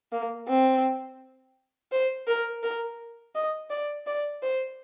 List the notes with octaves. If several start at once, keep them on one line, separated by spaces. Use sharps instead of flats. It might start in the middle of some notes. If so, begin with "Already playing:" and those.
A#3
C4
C5
A#4
A#4
D#5
D5
D5
C5